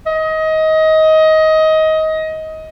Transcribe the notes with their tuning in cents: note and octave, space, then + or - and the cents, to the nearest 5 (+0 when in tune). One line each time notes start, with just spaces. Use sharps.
D#5 +20